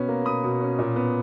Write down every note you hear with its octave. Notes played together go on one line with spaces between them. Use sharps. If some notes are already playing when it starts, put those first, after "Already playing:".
Already playing: B2 B3 C#4
A#3
B2 B5 D#6
B2
C#4
A#2
B3